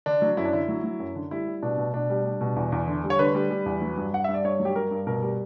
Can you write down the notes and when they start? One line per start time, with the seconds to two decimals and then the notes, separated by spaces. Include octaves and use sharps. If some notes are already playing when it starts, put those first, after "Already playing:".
0.06 D3 D4
0.22 F#3
0.37 F#2 E4
0.45 D4
0.53 D3 E4
0.68 F#3
0.84 F#3
1.00 F#2
1.15 D3
1.31 G3 E4
1.47 G3
1.62 B2 D4
1.78 B2
1.94 B2 D4
2.10 G3
2.25 G3
2.41 B2
2.56 E2
2.72 E2
2.88 D3
3.04 G3
3.10 C#5
3.19 D3 B4
3.35 G3
3.51 G3
3.66 E2
3.82 F#3
3.97 G2
4.13 G2 F#5
4.24 G2 E5
4.34 D5
4.44 G2 C#5
4.60 F#3
4.65 G4
4.76 G2 A#4
4.91 G2
5.07 B2 A#4
5.22 G3